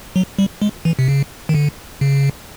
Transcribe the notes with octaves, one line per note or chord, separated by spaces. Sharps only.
F#3
G3
G#3
E3
C3
C#3
D#3
D3
C#3